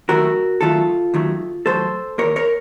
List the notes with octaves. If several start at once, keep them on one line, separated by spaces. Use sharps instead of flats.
D#2 D#3 F#3 A3 F#4 A#4
D#2 D#3 F#3 A3 F4 A4
D#2 D#3 F#3 A3
D#2 D#3 F#3 A3 A4 C5
D#2 D#3 A#3 A#4 C#5
A#4 C#5